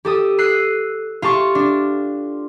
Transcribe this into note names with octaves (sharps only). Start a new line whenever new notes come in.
G4 A4 D#6
E6 F#6 C7 D#7
F4 G4 A5 C#6
D4